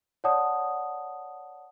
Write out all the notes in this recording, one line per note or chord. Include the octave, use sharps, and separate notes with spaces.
C#5 D5 F#5 A5 D#6